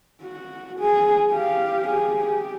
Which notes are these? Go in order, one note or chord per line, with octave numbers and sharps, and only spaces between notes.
F#4
G#4
G4 F5
G4 G#4
G4